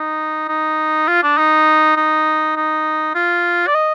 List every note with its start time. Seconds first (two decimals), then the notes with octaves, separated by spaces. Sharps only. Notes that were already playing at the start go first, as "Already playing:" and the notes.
Already playing: D#4
0.49 D#4
1.08 F4
1.23 D4
1.38 D#4
1.97 D#4
2.56 D#4
3.15 F4
3.67 D5
3.75 D#5